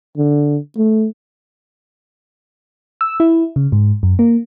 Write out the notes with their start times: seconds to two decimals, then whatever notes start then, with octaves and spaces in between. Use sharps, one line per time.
0.17 D3
0.77 A3
3.01 E6
3.20 E4
3.56 C#3
3.72 G#2
4.03 F#2
4.19 A#3